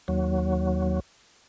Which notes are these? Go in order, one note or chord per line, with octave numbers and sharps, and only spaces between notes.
D#2 F#3